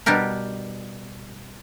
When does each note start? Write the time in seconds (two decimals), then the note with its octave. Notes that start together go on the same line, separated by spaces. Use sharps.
0.06 B2 G3 D4 G4 A#4